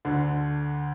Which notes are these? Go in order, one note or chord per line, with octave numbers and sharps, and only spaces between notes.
D2 D3